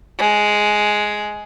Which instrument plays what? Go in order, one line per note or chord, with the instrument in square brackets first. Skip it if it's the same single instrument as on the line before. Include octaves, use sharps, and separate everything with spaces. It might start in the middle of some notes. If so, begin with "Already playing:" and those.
[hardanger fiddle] G#3